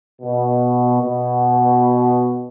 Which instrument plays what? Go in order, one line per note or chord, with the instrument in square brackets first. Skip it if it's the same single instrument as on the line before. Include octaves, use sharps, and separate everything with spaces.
[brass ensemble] B2
B2